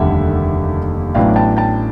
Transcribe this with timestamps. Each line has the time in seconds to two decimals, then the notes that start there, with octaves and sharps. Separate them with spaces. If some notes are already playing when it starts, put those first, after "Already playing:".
Already playing: F1 D#2 D3 G3 A#3 E5 F#5
1.15 A1 A2 F#3 B3 D4 F5 G5
1.36 G5 A5
1.57 G5 A5